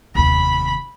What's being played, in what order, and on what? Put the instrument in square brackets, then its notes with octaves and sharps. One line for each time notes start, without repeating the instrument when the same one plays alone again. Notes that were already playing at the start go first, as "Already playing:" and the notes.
[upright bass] F1 D#2 [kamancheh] B5